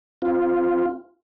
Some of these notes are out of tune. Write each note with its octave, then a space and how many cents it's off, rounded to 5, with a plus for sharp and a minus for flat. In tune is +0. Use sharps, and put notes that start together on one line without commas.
C4 +0 F4 +0